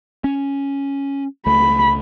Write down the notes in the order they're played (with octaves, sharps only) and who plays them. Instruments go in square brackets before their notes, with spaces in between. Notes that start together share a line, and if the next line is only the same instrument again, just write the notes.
[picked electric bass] C#4
[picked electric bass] C#2 A3 [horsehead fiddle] B5